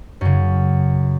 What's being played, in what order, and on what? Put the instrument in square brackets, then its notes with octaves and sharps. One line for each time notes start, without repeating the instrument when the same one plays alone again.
[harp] F#2 C#3